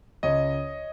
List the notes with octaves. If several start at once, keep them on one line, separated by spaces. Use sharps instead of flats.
C#2 C#5 D#5